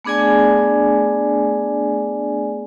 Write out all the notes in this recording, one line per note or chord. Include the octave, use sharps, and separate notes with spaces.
A3 B3 D4 G#4 D5 G#5